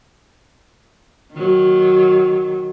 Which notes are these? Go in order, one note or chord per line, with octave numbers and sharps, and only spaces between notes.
D#3 F#3